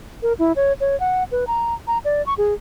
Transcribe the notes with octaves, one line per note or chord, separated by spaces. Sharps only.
A#4
E4
C#5
C#5
F#5
B4
A#5
A#5
D5
C#6
G#4